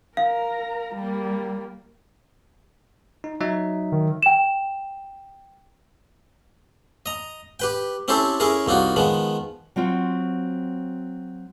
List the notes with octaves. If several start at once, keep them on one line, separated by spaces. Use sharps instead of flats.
A#4 F5 A#5
G3 A#3
D#4
F#3 D#4 E5
D#3
G5 E7
D#5 A#5
G4 B4 G5
C4 C#4 E4 G4 A4 C5
C#4 E4 G#4 A#4
C2 A#3 D#4 F4 F#4
D#3 F3 G#3 B3
F#3 C4 F4 C#5